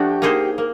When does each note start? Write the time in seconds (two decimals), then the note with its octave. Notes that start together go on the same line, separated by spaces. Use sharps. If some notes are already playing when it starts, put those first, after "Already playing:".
Already playing: F3 A3 D4 F#4 G4
0.22 A#3 D#4 G#4 C5
0.58 A#3